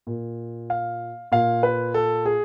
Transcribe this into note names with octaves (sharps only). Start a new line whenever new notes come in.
A#2
F5
A#2 F5
B4
A4
G#4